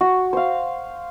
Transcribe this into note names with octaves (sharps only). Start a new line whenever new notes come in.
F#4
C5 F5